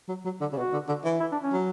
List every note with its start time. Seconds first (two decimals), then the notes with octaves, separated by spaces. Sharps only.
0.08 F#3
0.25 F#3
0.41 D3
0.52 C#3
0.57 B2 F#4
0.73 D3
0.88 D3
1.04 E3
1.20 E4
1.32 D4
1.42 C#4
1.52 F#3